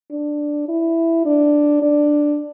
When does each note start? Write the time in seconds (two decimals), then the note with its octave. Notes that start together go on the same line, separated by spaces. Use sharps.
0.11 D4
0.68 E4
1.25 D4
1.82 D4